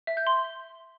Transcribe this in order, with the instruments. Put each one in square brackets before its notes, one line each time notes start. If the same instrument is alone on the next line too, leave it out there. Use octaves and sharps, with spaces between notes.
[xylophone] E5
G6
C6